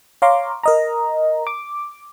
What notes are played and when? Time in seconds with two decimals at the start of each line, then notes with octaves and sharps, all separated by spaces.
0.22 C#5 F5 A#5 C6 D6
0.64 A#4 D#5 A#5
1.47 D6